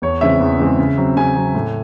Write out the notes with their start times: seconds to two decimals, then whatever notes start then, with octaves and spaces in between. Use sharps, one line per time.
0.02 E2 C#5
0.21 C#3 E3 G#3 C4 E5
0.40 E2
0.60 C#3 E3 G#3 C4
0.79 C#3
0.97 F#3 C4
1.16 C#3 G#5
1.36 F#3 C4
1.55 A2